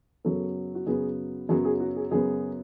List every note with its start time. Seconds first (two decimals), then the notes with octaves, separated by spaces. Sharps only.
0.25 F#2 C#3 F#3 B3 A4
0.75 F#4
0.86 F#2 C#3 F#3 B3 G#4
1.49 F#2 C#3 F#3 B3 G#4
1.65 G#4
1.80 F#4
1.96 G#4
2.11 F#2 C#3 F#3 B3 G#4